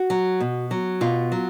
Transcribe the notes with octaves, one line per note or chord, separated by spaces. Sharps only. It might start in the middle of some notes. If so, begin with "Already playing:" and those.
Already playing: F#4
F#3
B2
F#3
B2 F4
F#3